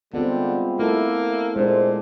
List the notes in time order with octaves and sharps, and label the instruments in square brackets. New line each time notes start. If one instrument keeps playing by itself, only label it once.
[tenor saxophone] D3 [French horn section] G3 G#3 F4 [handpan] B3 C4
[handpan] A3 E4 A4 [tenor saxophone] A#3
[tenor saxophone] A#2 [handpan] G#3 D4 [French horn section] C5